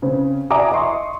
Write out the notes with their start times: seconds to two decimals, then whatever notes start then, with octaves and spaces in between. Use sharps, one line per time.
0.02 C#3 C4
0.50 D5 E5 G#5 A#5 D6 D#6
0.71 D#5 E5 C6 C#6